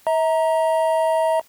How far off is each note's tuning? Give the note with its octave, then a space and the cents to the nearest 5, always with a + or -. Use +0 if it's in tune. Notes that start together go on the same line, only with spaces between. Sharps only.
E5 -40 A#5 +0